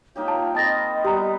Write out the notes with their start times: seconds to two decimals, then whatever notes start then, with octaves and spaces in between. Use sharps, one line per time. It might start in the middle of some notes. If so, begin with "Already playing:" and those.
0.16 A#3 D#4 F4 G4 C#5 F5
0.28 A5 A#5
0.55 C4 A#4 D#5 A5 B5 D#6 A6 A#6
1.05 G3 B3 G4 A#5